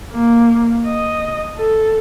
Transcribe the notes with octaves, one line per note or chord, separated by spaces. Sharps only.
A#3
D#5
A4